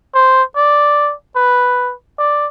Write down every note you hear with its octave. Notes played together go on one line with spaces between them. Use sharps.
C5
D5
B4
D5